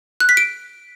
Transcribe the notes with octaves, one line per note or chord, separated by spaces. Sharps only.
F#6
B6
D7